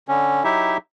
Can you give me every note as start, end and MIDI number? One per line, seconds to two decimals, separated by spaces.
0.08 0.43 50
0.08 0.43 61
0.44 0.77 54
0.44 0.77 63
0.44 0.77 64
0.44 0.77 67
0.44 0.77 76